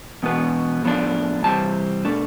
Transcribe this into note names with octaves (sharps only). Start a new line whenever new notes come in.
E2 B2 B3
A2 F3 B3 D4
C3 E3 G3 C4 A5
B2 A3 D4